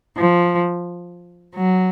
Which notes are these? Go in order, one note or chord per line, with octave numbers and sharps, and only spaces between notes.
F3
F#3